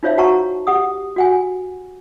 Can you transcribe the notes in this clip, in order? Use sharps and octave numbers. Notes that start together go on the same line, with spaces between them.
D#4 F4 C5 C#5 E5 F5
F#4 F#5 A5 A#5 C#6
G4 F#5 D#6
F#4 F#5 G#5